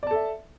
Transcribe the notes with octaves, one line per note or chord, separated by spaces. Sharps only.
A4 D5 E5 A5